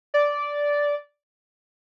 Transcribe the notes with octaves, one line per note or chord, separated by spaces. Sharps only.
D5